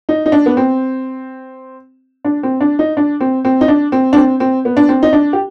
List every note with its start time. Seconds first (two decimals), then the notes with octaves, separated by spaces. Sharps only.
0.09 D#4
0.26 D#4
0.32 D4
0.46 B3
0.57 C4
2.25 D4
2.43 C4
2.61 D4
2.79 D#4
2.97 D4
3.20 C4
3.45 C4
3.61 D#4
3.68 D4
3.92 C4
4.13 D4
4.16 C4
4.40 C4
4.65 B3
4.77 D4
4.89 C4
5.03 D#4
5.13 D4
5.33 G4